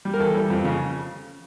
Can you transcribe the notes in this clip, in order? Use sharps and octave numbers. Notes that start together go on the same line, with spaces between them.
G3
A#4
E2 A4
G3
F2
C#3